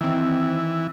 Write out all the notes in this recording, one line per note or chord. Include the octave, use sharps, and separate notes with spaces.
D#3 E3 C4